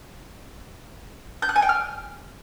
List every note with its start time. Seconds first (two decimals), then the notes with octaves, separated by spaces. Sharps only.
1.42 G6
1.49 F#6
1.56 G#5
1.62 G5
1.69 F6